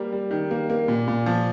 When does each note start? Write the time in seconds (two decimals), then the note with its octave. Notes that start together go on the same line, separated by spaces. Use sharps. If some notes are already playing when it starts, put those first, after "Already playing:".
Already playing: G3 A#3
0.12 G3
0.31 D#3
0.51 A#3
0.69 A#3
0.88 A#2
1.08 A#2
1.26 F3